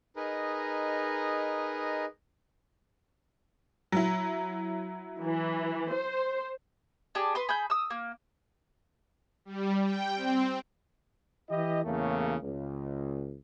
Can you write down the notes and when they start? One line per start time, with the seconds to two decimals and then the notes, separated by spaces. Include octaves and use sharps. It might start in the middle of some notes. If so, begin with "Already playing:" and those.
0.16 D#4 G#4 A#4 B4 D#5
3.92 F#3 E4
5.21 E3
5.92 C5
7.15 D4 G4 G#4
7.35 B4 C6 D#6
7.49 G#4 B5 G6
7.70 D#6 E6
7.90 A#3
9.45 G3
9.83 G5
10.15 C4
11.50 E3 E4 G4 D#5
11.84 E2 A2 C#3 A3 A#3
12.42 C#2